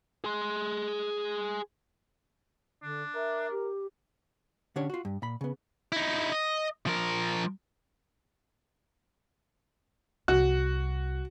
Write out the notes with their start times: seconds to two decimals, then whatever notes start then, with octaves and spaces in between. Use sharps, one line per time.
0.24 G#4 C6
2.82 D3 D4
3.15 A#4 E5
3.51 G4
4.76 D3 C#4 D4 G4 C#5
4.90 F4 F#4
5.05 G2
5.22 A#2 B5
5.41 C#3 B3
5.92 D#4 E4
6.32 D#5
6.87 F3 A#4
10.28 C2 F#4